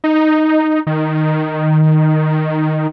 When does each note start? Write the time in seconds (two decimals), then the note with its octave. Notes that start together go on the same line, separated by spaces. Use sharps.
0.04 D#4
0.87 D#3